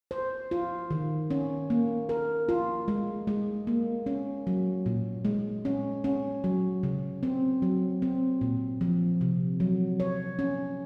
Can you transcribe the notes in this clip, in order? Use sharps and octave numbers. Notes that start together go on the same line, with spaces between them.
C5
F4
D#3
C#4
A#3
A#4
F4
G#3
G#3
A#3
C#4
F#3
A#2
G#3
C#4
C#4
F#3
C#3
C4
F#3
C4
A#2
F3
C3
F#3
C#5
C#4